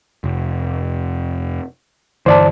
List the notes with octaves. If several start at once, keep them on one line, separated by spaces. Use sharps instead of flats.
F1
G2 D3 E3 C5 D5 A5